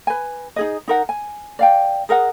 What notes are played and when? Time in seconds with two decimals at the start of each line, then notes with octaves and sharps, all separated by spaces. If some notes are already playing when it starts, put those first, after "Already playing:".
0.07 B4 G#5
0.56 D#4 G#4 D#5
0.88 D#4 A#4 F#5
1.09 G#5
1.59 D5 F5 G5
2.09 G#4 A#4 D#5 F#5